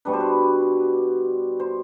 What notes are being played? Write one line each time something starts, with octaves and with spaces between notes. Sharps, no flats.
B2 G3 D4 B4
C5
B4
C5